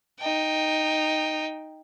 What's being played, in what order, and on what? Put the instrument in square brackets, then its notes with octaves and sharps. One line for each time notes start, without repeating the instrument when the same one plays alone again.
[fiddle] D#4 G5